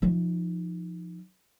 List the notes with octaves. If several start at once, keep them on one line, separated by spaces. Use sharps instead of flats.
F3 D#4